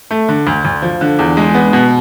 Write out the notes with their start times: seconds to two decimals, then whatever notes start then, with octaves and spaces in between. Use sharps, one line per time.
0.11 A3
0.29 D3
0.47 D2
0.65 D2
0.82 F3
1.01 D3
1.19 E2
1.37 G#3
1.55 B3
1.73 B2